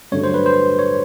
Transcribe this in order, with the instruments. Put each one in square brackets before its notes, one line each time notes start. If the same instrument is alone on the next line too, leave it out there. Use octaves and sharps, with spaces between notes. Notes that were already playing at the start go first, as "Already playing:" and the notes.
[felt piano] G2 D3 F#3 A3 D4 [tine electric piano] C#5
[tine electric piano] C5
B4
C5
C#5